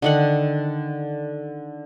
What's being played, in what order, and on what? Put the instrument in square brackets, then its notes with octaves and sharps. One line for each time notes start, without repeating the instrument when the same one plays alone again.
[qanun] D3 D#3 F#5